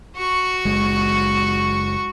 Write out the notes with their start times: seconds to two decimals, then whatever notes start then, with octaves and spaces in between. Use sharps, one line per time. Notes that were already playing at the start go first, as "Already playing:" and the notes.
0.17 F#4 C#6
0.65 F#1 G#3